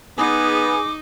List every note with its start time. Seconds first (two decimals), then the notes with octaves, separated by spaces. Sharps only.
0.18 B3 D#4 G#4 D6